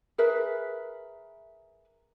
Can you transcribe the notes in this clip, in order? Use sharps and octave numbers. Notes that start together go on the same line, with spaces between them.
G#4 A#4 B4 E5